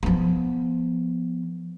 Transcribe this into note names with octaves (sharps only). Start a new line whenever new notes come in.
F3 B3